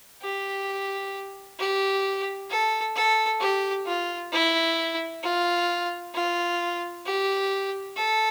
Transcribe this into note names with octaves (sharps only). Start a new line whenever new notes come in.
G4
G4
A4
A4
G4
F4
E4
F4
F4
G4
A4